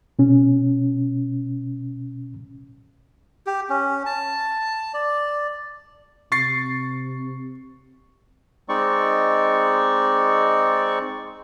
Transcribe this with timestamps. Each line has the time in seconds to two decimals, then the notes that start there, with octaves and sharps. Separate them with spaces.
0.19 B2 C#4
3.47 G4
3.69 C#4
4.06 A5
4.94 D5
6.32 C3 C#6 A6 C7
8.69 G#3 C4 D#4 D5 C#6